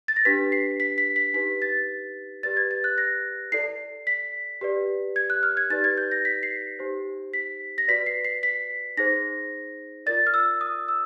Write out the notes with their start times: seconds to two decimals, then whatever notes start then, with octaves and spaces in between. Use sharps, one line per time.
0.08 A6
0.16 A#6
0.25 D4 G4 B4 B6
0.52 C7
0.80 B6
0.98 B6
1.16 B6
1.34 D#4 G4 B4 B6
1.62 A6
2.43 G4 B4 D5 A6
2.57 G#6
2.71 A6
2.84 F#6
2.98 A#6
3.52 E4 A4 D5 C7
4.07 B6
4.61 G4 B4 D5
5.16 G#6
5.30 F#6
5.43 F6
5.57 G#6
5.70 D#4 G4 B4 D5 A6
5.84 G#6
5.97 G6
6.12 A#6
6.25 B6
6.43 C7
6.79 D#4 G4 C5
7.34 B6
7.78 A#6
7.88 F#4 B4 D5 B6
8.06 C7
8.24 C7
8.43 B6
8.97 D#4 G#4 C5 A#6
10.06 F4 A#4 D5 A6
10.27 F6
10.34 E6
10.61 D#6
10.88 E6